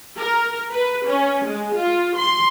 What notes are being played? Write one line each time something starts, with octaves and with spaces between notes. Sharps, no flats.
A#4
B4
C#4
G#3
F4
C6